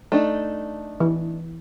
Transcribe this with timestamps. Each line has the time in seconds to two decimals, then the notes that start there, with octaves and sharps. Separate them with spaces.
0.12 A3 D4 D#4
1.00 E3